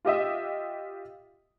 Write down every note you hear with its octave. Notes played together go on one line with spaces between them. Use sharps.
F4 G4 D#5 E5